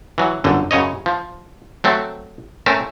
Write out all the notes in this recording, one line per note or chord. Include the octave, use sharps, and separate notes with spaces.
E3 F#3
G1 F#2 D3
F#2 C#3 C#5 D#5
F3
F#3 A3 C4
A3 C4 C#4 A#4 E5